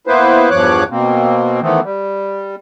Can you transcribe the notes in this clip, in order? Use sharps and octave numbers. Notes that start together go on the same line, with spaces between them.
A#3 B3 E4 B4 C5
E2 G2 F3 C#5 D6 F#6
B2 A#3 C4
D#3 E3 A3 B3 C4
G3